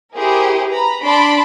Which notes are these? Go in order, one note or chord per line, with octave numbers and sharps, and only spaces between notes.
E4 G4 G#4 A#4 C5
B4 A#5 B5
D4 D5 A5 B5 C6 D7